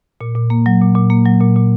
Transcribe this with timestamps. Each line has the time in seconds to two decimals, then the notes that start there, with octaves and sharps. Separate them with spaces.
0.21 A#2
0.36 A#2
0.50 A#3
0.66 F#3
0.81 A#2
0.95 A#2
1.10 A#3
1.26 F#3
1.40 A#2
1.56 A#2